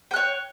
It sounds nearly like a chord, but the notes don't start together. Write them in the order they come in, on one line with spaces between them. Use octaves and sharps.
G5 F#6 C#5